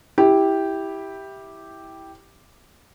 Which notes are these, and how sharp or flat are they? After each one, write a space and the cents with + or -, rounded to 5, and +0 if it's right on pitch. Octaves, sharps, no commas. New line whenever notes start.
E4 -10 G4 +0